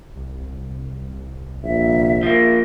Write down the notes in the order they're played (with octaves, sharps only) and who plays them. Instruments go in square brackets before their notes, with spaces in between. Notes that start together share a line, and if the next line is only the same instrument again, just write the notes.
[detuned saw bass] C2
[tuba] A#1 [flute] E5
[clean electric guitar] F3 A#3